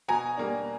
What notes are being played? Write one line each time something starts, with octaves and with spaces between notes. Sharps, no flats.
B2 G#5 A#5
G3 A#3 D4